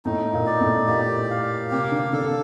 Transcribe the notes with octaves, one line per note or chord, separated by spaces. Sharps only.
A2 A3 D#4
A#2 A#3
D5
A2 A3
A#2 A#3 G4
F5
C3 A#3 C4
D3 D4
D3 D4 A4